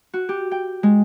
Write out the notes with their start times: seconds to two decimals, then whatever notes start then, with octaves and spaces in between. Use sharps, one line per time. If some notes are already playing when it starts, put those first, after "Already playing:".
0.13 F#4
0.29 G4
0.51 G5
0.83 G#3